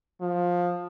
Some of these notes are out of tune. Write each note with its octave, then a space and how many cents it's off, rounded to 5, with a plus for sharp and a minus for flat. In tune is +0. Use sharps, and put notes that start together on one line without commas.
F3 +15